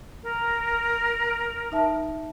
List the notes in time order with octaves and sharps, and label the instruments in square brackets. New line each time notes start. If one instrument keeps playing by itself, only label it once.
[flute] A#4
[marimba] D#4 E5 A5